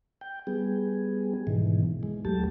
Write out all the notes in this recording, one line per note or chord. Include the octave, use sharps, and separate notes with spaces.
G5
G3 B3 G#4
G#2 B2 D#3 E3
G#3
D#2 F#3 A3 G4 A5